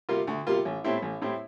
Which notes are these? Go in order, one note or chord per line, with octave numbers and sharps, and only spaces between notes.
C3 G3 A#3 F4
D2
C3 G3 A#3 F4
A1
A2 G3 C4 E4
A1
A2 G3 C4 E4